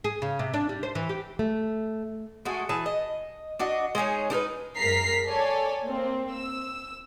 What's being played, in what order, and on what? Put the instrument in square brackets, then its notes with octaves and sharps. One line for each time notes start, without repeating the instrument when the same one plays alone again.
[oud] G#4
C#3
C3
D4
G3
C5
E3
G4
[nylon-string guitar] A3
[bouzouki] G#3 A3 F#4 G#4
E3 G#4 A5
D#5
D4 F#4 D#5
G#3 D#4 G#4 C#5
D4 D#4 A#4 B4
[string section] F#2 G#3 A#4 A#5 B6 C7
A4 C#5 D5 G#5
A#3 C4
E6